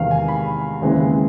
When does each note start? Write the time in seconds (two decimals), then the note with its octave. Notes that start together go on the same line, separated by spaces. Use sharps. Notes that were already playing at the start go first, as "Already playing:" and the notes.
Already playing: E2 C3 D#3 G#3 F5
0.11 G#5
0.28 B5
0.81 D#2 C#3 E3 G#3 C4